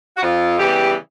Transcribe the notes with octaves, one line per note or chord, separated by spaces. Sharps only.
F#4
F2 F4
C#3 E3 G3 B3 G4